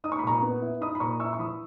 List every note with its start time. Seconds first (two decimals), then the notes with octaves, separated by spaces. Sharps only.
0.04 D#4 D#6
0.12 C#6
0.19 B5
0.24 A#2 A#5 C#6
0.42 B3
0.62 E4
0.81 D#4 B5 D#6
0.95 B5
1.00 A#2 A#5 C#6
1.20 E4 C#6 E6
1.33 C#6
1.39 E3 B5 D#6